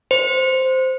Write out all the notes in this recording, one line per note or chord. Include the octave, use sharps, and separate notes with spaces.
C5